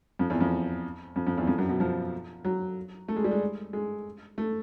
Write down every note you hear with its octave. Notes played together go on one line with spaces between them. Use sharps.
F2
E2
F2
F2
F2
E2
F2
F#2
B2
F3
F#3
A3
G#3
G3
G#3
G#3
A3